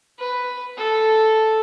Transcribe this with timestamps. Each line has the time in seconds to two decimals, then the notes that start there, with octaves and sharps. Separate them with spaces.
0.19 B4
0.77 A4